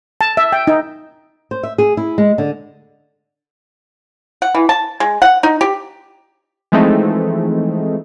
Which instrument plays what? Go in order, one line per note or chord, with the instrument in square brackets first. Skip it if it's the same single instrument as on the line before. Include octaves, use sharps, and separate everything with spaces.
[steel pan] A5
E5
G5
D#4
[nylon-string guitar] C5
E5
G#4
E4
G#3
D3
[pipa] F#5
E3
A5
G#3
F#5
D#4
G4
[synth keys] E3 F3 G#3 A3 C4 D#4